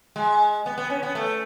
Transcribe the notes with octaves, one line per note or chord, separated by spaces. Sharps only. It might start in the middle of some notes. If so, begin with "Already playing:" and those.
G#3
B3
B3
C#4
B3
A3